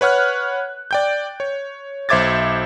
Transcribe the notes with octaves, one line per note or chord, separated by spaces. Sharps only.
B4 C#5 F#5 F6 F#6
D5 G5 G6
C#5
B1 C5 E5 D6 G#6 A6